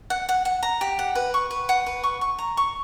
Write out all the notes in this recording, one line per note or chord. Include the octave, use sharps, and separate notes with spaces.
F#5
F#5
F#5
A#5
G4
F#5
B4
C#6
B4
F#5
B4
C#6
C#6
A#5
C#6